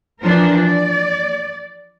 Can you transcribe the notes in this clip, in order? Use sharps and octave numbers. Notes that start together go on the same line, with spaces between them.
E3 F3 D4 A#4
D5